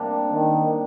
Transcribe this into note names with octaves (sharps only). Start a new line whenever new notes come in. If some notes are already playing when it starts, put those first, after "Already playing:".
Already playing: C3 G3 A#3 D4 G4
D#3